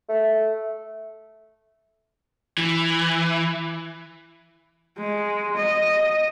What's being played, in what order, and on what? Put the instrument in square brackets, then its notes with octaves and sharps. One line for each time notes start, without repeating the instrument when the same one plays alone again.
[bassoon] A3
[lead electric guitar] E3
[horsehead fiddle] G#3
D#5